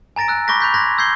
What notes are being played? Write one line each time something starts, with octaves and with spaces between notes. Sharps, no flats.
G#5 A#5 A6 A#6 D7
E6 F#6
B5 C#6 D6 G6 A#6 B6
B5 C#6 F#6 G6 A6 B6
C6 F#6 G#6 A#6 B6
E6 G6 G#6 C7 G7